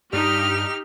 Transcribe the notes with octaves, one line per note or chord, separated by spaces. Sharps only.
G2 D#4 G4 F6